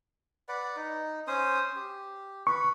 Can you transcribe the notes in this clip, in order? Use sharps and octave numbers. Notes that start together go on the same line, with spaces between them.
B4 D5 F#5
D#4
C#4 C5 D#6
G4
B4 C#6